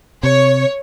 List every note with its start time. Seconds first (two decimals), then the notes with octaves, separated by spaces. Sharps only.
0.23 C3 C#5